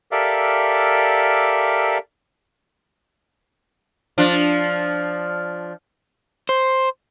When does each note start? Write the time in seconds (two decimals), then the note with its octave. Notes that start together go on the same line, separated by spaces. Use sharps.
0.11 G4 A4 A#4 D5 E5 F5
4.18 F3 D4
6.49 C5